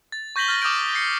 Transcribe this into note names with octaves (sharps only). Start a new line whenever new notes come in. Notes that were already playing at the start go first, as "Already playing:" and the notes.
A6
C#6 G6 A#6 B6 F#7 G7
F6 A6 A#6
D6 D#6 F6 G6 D7
A#6 C7 C#7